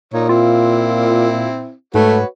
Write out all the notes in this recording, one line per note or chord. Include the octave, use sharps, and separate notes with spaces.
A#2 D#4 C#5
C4 E4 F4
G#2 A3 F#4 B4 C#5